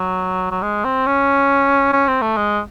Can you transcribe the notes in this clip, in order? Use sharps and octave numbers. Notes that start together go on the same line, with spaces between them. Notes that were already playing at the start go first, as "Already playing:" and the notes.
Already playing: F#3
F#3
G#3
C4
C#4
C#4
C4
A3
G#3